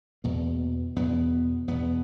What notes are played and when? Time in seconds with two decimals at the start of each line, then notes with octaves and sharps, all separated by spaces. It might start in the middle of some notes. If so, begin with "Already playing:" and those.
0.24 E2 B2 A#3
0.96 E2 B2 B3
1.68 E2 B2 B3